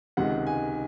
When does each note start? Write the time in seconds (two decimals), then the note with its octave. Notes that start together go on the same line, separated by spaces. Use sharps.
0.17 C#2 C3 D#3 G#3 F#5
0.47 G#5